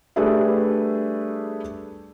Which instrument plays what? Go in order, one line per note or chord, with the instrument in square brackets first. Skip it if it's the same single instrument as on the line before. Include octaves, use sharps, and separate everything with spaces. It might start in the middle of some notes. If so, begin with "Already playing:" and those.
[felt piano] G3 A3 D4 G#4 B4 E5